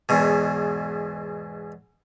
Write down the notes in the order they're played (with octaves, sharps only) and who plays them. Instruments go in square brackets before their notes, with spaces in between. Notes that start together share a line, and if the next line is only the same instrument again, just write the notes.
[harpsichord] E2 G#2 B2